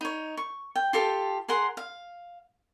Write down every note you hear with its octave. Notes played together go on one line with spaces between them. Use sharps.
D#4 C#5
C#6
G5
F4 G4 A4 A5
G#4 A#4 F#5 C6
F5